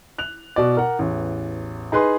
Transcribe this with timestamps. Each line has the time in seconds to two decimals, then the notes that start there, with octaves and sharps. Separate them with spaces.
0.18 F#6 F7
0.56 B2 D5
0.77 A#4 F#5
0.99 A1 E2
1.92 D#4 G#4 B4 C6